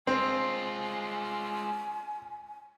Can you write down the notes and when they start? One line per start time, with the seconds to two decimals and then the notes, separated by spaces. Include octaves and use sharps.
0.07 G#3 C4 F4 G#5